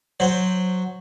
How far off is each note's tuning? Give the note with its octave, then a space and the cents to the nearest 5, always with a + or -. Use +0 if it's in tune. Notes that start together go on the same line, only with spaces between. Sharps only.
F#3 -5 C5 +0